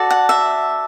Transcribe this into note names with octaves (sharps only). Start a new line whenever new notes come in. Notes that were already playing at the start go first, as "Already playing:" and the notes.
Already playing: F#4 A4 D5
F#5
E5